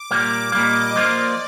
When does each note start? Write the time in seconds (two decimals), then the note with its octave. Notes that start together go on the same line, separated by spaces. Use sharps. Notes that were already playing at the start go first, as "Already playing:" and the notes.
Already playing: D6
0.11 A#2 G3 A#3
0.52 A#2 G3 A#3 D#5
0.96 F3 A#3 F4 D5